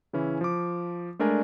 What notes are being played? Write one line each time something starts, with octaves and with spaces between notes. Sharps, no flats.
C#3 E3 C#4 E4
F3 D6
G#3 A3 D4 A#4 D5 G#5